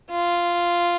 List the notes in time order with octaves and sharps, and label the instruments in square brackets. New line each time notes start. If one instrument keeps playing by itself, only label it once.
[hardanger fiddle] F4